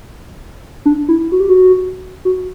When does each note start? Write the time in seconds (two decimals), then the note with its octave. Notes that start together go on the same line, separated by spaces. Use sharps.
0.86 D4
1.09 E4
1.32 F#4
1.40 G4
1.49 F#4
2.25 F#4